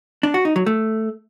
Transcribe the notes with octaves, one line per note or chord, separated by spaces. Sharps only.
D4
F#4
D#4
F#3
A3